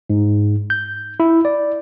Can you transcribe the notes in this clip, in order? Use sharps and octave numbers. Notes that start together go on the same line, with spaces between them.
G#2
G6
E4
D5